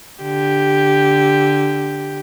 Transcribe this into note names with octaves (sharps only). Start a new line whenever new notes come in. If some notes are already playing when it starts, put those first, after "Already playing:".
D3 G4